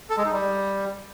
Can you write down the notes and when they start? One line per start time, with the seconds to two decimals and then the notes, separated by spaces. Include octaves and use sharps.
0.10 A4
0.17 G#3
0.25 D#4
0.32 G3